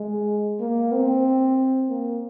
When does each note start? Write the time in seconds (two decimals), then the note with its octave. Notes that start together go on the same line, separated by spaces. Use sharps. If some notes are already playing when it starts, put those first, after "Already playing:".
Already playing: G#3
0.60 A#3
0.92 C4
1.89 A#3